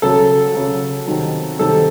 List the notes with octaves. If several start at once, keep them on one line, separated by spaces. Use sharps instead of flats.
C#3 F#3 A4
C#3 F#3
C3 D#3 F#3
C3 D#3 F#3 A4